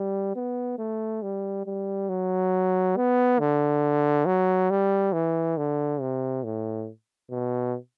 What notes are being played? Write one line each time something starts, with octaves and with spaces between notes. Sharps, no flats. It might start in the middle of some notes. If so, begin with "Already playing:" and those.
Already playing: G3
B3
A3
G3
G3
F#3
B3
D3
F#3
G3
E3
D3
C3
A2
B2